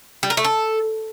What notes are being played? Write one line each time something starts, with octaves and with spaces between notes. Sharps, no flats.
G3
A#4
A3
A4